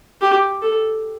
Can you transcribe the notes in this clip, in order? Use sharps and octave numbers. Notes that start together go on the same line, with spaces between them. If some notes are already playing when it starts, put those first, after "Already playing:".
G4
A4